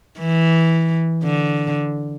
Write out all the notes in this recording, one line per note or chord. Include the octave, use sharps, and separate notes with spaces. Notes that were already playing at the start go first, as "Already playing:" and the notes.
E3
D3